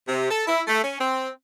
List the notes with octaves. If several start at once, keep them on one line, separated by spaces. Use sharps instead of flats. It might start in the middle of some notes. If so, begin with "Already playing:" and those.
C3
A4
E4
A3
C#4
C4